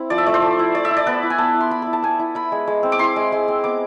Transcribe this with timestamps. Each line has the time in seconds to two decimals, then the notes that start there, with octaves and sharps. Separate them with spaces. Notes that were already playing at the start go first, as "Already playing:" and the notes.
Already playing: C4 E4
0.10 F3 D5
0.18 E5
0.26 A3 D5
0.34 C5
0.42 A3
0.59 E4
0.75 A3 D5
0.85 E5
0.91 E4
0.97 D5
1.07 B3 B4
1.23 E4
1.30 G#5
1.38 B3 A5
1.55 E4
1.61 C6
1.71 B3 B5
1.82 E4 B5
1.93 A5
2.03 B3 G#5
2.19 E4
2.35 E4 B5
2.52 G#3
2.67 G#3
2.83 C4
2.92 D6
2.99 E4 C6
3.16 G#3
3.32 G#3
3.48 C4
3.64 B3 D6